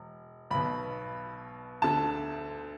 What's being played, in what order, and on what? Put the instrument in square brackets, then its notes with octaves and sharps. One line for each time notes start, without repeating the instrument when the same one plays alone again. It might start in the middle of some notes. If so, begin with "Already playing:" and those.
Already playing: [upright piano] E1
B1 B2 B5
D2 D3 A5